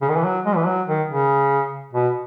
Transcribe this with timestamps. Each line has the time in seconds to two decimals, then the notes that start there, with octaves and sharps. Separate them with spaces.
0.02 C#3
0.09 D#3
0.17 E3
0.24 F#3
0.45 G#3
0.56 E3
0.66 F#3
0.87 D#3
1.09 C#3
1.93 B2